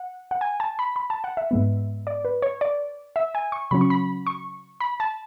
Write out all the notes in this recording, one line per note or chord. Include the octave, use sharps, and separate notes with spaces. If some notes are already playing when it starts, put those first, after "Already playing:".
Already playing: F#5
F#5
G#5
A5
B5
B5
A5
F#5
E5
G#2 G#3 B3
D5
B4
C#5
D5
E5
G#5
C#6
C#3 F#3 C#4 B5
C#6
B5
C#6
B5
A5